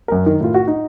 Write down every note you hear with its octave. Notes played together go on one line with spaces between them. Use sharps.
F#2 A#4
D#3
A2 F4
F#4
D#4